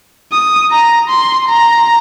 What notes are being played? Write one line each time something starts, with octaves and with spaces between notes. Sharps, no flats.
D#6
A#5
C6
A#5